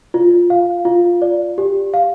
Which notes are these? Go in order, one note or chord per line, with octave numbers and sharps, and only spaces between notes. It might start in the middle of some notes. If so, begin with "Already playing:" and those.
F4
F5
F4
D5
G4
F5